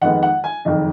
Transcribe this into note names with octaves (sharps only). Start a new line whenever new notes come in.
F2 D#3 G#3 B3 F#5
F#5
G#5
F#1 F2 D#3